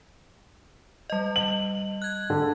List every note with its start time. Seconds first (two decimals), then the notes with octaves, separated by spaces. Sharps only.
1.10 G3 D#5
1.36 F#7
2.02 F#6 G#6
2.30 D3